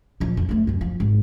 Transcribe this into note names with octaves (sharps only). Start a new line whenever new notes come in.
A#2 F3
F2
A3 F4
F#2 D3
F3
G#1